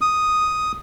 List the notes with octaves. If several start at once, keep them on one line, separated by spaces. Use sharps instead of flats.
D#6